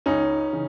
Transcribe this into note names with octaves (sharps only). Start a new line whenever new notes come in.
C#2 C#4 D#4
C#3 E3